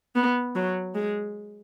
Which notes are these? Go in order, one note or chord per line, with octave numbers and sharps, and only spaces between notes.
B3
F#3
G#3